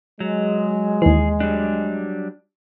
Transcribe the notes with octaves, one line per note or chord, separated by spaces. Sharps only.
F#3 G#3
D#2 E3 G#4
F#3 G3 D4